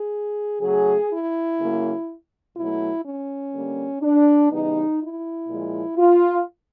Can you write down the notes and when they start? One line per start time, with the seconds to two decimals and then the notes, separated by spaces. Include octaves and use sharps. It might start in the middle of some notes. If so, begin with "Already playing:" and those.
Already playing: G#4
0.61 C#3 F#3 A3 G#4
1.10 E4
1.59 C#3 F#3 A#3
2.56 B2 F#3 A3 E4
3.04 C#4
3.53 D3 G3 A#3
4.02 D4
4.51 C#3 E3 G3 B3 D#4
5.00 E4
5.48 A#2 F3 G#3
5.97 F4